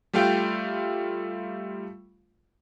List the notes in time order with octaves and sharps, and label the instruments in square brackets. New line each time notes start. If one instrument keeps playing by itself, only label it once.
[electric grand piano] G3 A3 F4 F5 G5